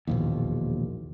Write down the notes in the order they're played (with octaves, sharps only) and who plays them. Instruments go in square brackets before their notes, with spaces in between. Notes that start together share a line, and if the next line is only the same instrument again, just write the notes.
[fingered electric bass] E1 A#1 D#2